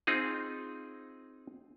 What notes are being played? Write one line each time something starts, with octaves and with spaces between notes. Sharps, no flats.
C4 D#4 F4 G#4